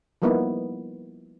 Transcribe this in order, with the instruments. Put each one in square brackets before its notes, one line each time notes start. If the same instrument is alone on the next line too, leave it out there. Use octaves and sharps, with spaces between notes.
[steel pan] F3 G3 A#3 B3 D#4 E4